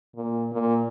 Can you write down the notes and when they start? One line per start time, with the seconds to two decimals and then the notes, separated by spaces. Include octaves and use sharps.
0.16 A#2
0.53 A#2